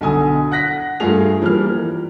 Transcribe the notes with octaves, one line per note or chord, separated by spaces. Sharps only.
B1 D3 G#5 D#6
F#5 F#6 A#6 B6
G2 A3 F4 G#4 F7
E3 F3 G3 A#3 F6
A#4